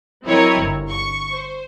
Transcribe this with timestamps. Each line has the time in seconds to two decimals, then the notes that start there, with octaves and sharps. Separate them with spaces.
0.24 F#3 C4 E4 A#4 C#5 D#5
0.59 G1
0.89 C#6
1.31 C5